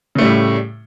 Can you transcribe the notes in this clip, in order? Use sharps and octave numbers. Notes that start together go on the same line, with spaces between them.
A2 C#3 G3 A3